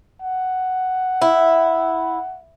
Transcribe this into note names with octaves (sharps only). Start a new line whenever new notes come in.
F#5
E4